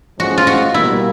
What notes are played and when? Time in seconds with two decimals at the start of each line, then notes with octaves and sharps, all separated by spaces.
0.19 A2 F3 G#3 C#4 F#4
0.38 F4
0.47 F#4
0.74 B2 G3 A#3 E4